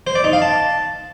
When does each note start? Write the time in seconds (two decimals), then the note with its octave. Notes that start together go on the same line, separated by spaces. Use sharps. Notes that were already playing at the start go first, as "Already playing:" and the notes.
0.07 C5
0.15 D5
0.24 D#4
0.33 F5
0.42 A5